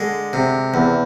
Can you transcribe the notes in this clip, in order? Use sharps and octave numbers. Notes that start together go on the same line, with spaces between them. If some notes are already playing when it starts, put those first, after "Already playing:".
Already playing: D3 G#3
C3
E2